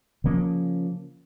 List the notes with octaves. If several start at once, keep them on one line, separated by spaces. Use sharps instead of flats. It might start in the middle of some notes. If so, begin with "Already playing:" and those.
C#3 F3 A#3 C#4